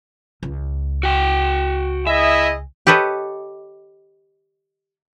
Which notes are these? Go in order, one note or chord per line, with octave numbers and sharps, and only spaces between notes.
C#2
F#4 G5
E4 G#4 D#5 E5
G4 A4 B4 C#5 D#5